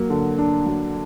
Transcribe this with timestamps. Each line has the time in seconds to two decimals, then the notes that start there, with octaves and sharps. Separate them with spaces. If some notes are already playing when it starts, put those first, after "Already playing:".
Already playing: F#3 A#3
0.10 D3
0.38 D4
0.66 F#3